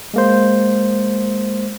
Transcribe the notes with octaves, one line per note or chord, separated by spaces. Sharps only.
G#3 A#3 C5